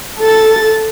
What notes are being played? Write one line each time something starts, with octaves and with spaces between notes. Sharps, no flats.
A4 A6